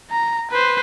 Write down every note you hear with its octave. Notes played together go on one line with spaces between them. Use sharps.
A#5
B4 C5